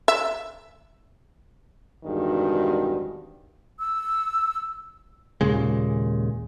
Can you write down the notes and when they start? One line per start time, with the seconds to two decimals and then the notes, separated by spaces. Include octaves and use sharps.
0.08 E5
2.04 E2 G2 C3 D#3 G#3 F#4
3.80 E6
5.41 D#2 A#2 C#3 G#3